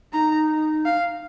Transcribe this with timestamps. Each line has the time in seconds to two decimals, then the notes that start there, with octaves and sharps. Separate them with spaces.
0.13 D#4 A#5
0.86 F5